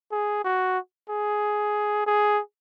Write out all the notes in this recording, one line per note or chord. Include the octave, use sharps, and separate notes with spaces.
G#4
F#4
G#4
G#4